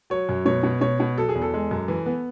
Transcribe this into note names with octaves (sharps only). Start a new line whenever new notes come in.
F#3 C#5
F#2
B2 C#5
B2
B2 C#5
B2
F#3 A4
G#4
E2
A4
G#3
F#2
E3
B3